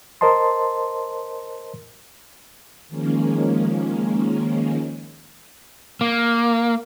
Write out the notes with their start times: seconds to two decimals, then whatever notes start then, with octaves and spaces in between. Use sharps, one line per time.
0.21 A#4 C5 D#5 A5 C6
2.88 D#3 F3 G#3 A#3 C#4
6.01 A#3